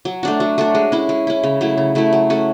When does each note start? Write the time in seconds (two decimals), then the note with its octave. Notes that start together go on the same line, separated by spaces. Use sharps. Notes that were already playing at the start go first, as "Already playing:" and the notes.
0.05 F#3
0.23 A3 D4 F#4
0.40 F#3
0.58 A3 D4 F#4
0.75 G#3
0.92 C#4 E4
1.09 G#3
1.27 C#4 E4
1.43 C#3
1.61 F#3 A3 E4
1.78 C#3
1.95 F#3 A3 E4
2.13 F#3
2.30 A3 C#4 F#4